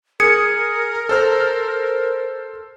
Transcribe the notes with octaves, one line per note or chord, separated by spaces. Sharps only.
G#4 A#4 D#6 G#6 C#7
A4 C5 F6